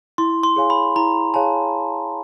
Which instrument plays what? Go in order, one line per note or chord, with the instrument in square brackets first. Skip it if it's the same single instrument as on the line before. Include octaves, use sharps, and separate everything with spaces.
[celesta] E4 [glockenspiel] C6
[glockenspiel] C6
[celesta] G#4 C#5 F5 G#5
[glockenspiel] B5
[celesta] E4 [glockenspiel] A#5
[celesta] G#4 C#5 F5 G#5 [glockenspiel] A5